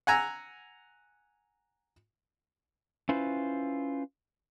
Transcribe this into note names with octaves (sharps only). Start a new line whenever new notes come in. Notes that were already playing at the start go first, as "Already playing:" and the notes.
F#5 G#5 A#5 E6
C#4 E4 F4 B4 C5